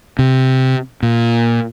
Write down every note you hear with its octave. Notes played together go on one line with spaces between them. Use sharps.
C3
A#2